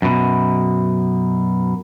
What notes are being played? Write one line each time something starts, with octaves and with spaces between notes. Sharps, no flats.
F#2 B2